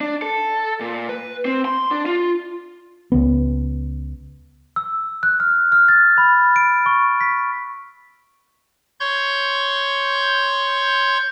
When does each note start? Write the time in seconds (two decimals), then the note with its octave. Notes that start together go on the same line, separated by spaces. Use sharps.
0.01 D4
0.22 A4
0.80 A#2
1.09 B4
1.45 C4
1.65 C6
1.91 D4
2.06 F4
3.12 C#2 B3
4.76 E6
5.23 F#6
5.40 F6
5.72 F6
5.88 A6
6.18 B5
6.56 D7
6.86 C#6
7.21 B6
9.00 C#5 C6 C#6 G6